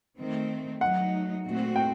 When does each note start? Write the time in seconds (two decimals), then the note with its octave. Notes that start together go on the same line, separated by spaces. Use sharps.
0.19 D#3 A3 C4
0.81 F#3 A3 D#4 F#5
1.45 A#2 A3 C4 F#4
1.76 G5